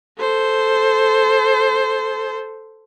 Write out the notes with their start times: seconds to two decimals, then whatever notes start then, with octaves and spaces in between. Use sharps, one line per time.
0.19 A4 C5